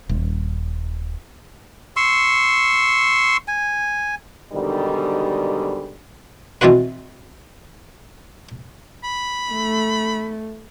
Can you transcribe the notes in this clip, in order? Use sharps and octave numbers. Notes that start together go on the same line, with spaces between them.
D#1
C6 C#6 E6
G#5
G#2 B2 D3 D#3 G3
B2 E3 C4 F4 F#4 B4
B5
A3